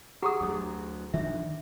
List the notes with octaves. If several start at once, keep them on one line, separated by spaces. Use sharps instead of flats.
G4 G#4 F#5 A#5 C#6 D#6
D2 F#3
D#3 F3 D4 E5